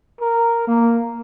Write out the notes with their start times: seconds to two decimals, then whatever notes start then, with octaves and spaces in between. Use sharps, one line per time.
0.21 A#4
0.67 A#3